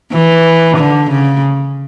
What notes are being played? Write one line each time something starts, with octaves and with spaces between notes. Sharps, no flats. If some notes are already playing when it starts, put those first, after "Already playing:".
E3
D3
C#3